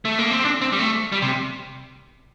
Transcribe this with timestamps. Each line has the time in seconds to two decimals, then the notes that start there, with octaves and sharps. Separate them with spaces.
0.05 A3
0.18 A#3
0.31 C4
0.45 D4
0.61 C4
0.72 G3
0.79 A3
1.12 G3
1.22 C3